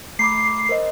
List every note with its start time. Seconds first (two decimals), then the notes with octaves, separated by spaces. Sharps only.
0.19 A3 B5 D6 C7
0.69 A#4 C5 D#5